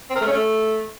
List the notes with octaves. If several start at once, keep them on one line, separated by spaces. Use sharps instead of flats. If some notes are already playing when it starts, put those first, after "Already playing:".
C4
A#4
A3
C#4
A3